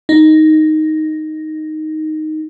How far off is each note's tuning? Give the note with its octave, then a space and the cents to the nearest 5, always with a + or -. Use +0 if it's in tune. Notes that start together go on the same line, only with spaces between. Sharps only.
D#4 +0